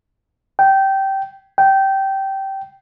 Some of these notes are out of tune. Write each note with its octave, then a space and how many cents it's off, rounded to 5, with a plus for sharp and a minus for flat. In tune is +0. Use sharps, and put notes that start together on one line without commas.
G5 -15
G5 -15